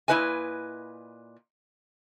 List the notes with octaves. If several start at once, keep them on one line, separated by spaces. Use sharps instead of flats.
A#2 A#3 E4 B4 D#5 G#5